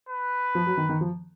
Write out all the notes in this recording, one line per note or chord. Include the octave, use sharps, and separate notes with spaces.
B4
F3
F#3
D#3
D#3
F3